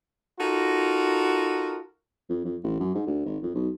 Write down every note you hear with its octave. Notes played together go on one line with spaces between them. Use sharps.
D#4 F4 F#4 A4 A#4
F2
F2
A1
F#2
G#2
D2
G#1
F2
B1